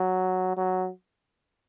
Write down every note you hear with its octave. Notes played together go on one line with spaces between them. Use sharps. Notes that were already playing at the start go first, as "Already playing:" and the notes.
Already playing: F#3
F#3